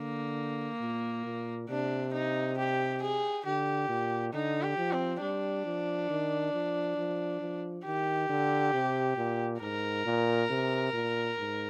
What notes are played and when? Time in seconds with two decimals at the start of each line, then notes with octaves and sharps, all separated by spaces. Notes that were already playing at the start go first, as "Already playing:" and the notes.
Already playing: D3 A#3
0.81 A#2
1.25 A#2
1.69 C3 D4
2.14 D#4
2.57 G4
3.02 G#4
3.46 D3 G4
3.89 A#2
4.33 D3 D#4
4.62 G4
4.78 F3
4.92 C4
5.21 G3 D4
5.66 F3
6.10 D#3
6.54 F3
6.98 F3
7.41 F3
7.85 D#3 G4
8.30 D3
8.74 C3
9.17 A#2
9.61 G#2 A#4
10.06 A#2
10.50 C3
10.93 A#2
11.38 G#2